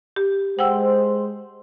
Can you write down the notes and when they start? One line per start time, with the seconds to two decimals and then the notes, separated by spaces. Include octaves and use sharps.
0.16 G4
0.59 G#3 C5 F#5 G5 E6